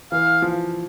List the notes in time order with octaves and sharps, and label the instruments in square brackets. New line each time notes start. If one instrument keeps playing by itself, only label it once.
[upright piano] E3 [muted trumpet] F5
[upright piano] F3